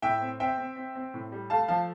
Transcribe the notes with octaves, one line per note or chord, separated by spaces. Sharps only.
A2 E5 G5
C4
C4 E5 G5
C4
C4
C4
A2
G3
A3 F5 A5
F3 F5 A5